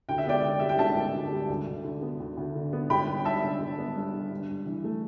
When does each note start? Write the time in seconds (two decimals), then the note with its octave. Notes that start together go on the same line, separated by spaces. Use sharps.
0.09 D2 G5
0.18 E5
0.26 B3 D5 G5
0.44 D3
0.60 G3 E5
0.69 G5
0.79 D2 E5 A5
0.96 B3
1.14 D3
1.31 G3
1.49 D2
1.67 D2
1.84 D3
2.02 B3
2.20 D2
2.37 D2
2.55 D3
2.73 B3
2.90 G1 G5 B5
3.08 B3
3.25 G2 E5 A5
3.43 D3
3.61 G1
3.78 B3
3.96 G2
4.13 D3
4.31 G2
4.49 G2
4.66 E3
4.84 A3